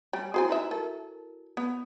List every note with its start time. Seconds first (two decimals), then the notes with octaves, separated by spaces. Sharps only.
0.13 G3 C#5 G#5
0.34 E4 F#4 G#4 C5 G#5
0.49 D#4 B4 E5
0.71 A4 A#4
1.57 B3